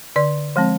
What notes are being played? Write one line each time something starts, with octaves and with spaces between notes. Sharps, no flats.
D3 D5
F3 G#3 C4